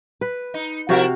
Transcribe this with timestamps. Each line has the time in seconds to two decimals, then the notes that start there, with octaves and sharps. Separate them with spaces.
0.21 B4
0.54 D#4
0.89 C3 F3 E4 F#4 A#4 F5